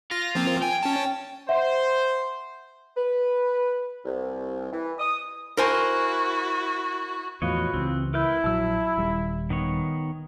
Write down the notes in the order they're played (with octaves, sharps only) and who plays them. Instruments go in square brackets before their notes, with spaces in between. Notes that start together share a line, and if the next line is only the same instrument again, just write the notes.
[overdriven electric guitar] F4 [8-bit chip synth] A#6
[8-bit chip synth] F3 A#3 C4
[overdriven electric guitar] G5 [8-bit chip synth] G#5
[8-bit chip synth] C#4 A5
[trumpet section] C5 [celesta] E5 F#5
[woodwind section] B4
C2
E3
D#6
[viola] E4 F#4 [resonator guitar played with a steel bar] A#4 C5 G#5
[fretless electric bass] E2 A2 F3 [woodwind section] F4 F#4 B4 [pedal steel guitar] C#5 D#5
[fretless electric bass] C#2 E3 [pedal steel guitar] C4
[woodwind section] E4 [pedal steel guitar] A#4 B4 G6
[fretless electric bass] A#1 F#3 [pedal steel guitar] A5 E6
[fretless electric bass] D#1 G3
[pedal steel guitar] D#3 B3 C#5